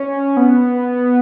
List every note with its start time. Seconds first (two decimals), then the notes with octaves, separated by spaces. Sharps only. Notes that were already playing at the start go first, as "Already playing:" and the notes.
Already playing: C#4
0.37 B3